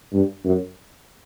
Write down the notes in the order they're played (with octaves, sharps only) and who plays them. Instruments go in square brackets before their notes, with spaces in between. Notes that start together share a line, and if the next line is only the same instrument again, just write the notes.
[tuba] G2
F#2